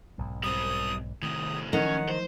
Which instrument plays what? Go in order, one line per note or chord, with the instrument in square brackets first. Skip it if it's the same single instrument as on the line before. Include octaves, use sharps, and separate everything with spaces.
[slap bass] B1 G#2
[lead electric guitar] G3 C4 [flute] D#6
[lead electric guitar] A2 C3 [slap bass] D#3 [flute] D#6
[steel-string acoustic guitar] D#3 [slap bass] F3 F#3 A3 [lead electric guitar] C#4 [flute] F#5
[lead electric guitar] C5